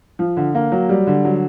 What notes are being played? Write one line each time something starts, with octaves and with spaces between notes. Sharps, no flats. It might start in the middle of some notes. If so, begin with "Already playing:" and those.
F3
D3
A#3
F#3
G3
D3
F#3